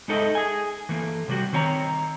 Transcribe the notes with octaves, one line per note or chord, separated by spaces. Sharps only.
G#3 D#4 A4 D#5 E5
G#4 G#5
E3 A3 A#3
C3 G3 F#4
D#3 C4 C#5 F#5 A#5